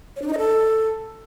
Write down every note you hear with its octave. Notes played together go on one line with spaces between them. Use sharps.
C#5
D4
D#4
D#5
A4